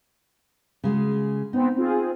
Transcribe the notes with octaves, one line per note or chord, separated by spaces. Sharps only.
C#3 G#3 F#4
B3 C4 D#4
C4 F4 G#4